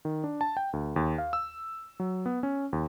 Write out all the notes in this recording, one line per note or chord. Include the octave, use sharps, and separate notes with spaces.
D#3
D4
A5
G5
D2
D#2
F5
E6
F#3
B3
C#4
D#2